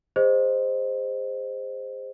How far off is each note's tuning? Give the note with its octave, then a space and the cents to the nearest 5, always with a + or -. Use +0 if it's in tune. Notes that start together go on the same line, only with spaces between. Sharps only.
G#4 -30 C5 +0 D#5 -5